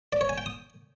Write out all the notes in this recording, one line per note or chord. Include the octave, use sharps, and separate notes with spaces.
D5
C#5
G#5
G5
D#6